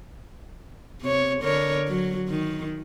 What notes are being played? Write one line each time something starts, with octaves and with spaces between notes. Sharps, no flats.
C3 C#5
D3 A#4 C#5
F#3
D#3